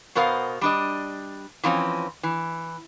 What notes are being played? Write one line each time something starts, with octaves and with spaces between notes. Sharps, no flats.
B2 B3 A#4 C5 F5
G3 D4 D#5
E3 F3 C4 C#4
E3